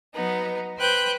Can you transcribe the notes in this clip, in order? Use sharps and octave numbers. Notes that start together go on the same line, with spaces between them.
F#3 B3 D#4
B4 C5 G5 F#6 G6